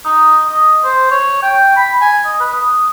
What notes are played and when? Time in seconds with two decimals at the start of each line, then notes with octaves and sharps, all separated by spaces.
0.05 D#4
0.47 D#5
0.84 C5
1.11 C#5
1.43 G5
1.76 B5
2.02 G#5
2.25 D#5
2.40 B4
2.53 D#6